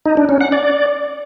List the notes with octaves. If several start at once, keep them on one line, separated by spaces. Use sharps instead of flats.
D#4
D4
C#4
F#5
D5